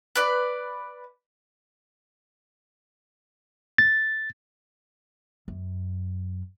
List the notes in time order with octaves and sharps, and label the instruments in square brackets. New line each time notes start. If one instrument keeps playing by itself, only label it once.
[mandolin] B4 D5
[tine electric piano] A6
[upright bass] F#2